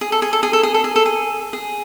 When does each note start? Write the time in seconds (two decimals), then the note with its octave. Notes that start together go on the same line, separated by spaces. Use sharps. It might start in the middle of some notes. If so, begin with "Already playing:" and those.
0.01 G#4
0.12 A4
0.22 G#4
0.33 A4
0.43 G#4
0.53 A4
0.63 G#4
0.74 A4
0.84 G#4
0.96 A4
1.06 G#4
1.53 G#4